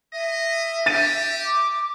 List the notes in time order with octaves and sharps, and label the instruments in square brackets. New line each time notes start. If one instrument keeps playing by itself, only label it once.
[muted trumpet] D#5 [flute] E5
[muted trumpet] G4 [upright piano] A6 D#7
[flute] D6